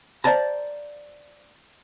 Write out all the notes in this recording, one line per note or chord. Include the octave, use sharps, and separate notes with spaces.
C5 D5 F5 A5 A#5